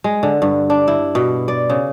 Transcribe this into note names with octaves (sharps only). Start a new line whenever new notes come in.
G#3
D3
G2
D4
E4
B2
D5
C#3